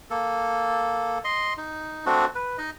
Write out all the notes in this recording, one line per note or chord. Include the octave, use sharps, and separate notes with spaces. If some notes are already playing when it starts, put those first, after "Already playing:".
A#3 A4
D#5 C6
D#4
A3 C4 D4 F#4
B4
D#4 D#5